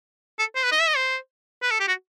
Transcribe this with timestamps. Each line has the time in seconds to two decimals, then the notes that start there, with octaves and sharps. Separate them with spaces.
0.39 A4
0.55 C5
0.63 B4
0.72 D#5
0.80 E5
0.88 D#5
0.96 C5
1.62 B4
1.71 A4
1.80 G4
1.88 F#4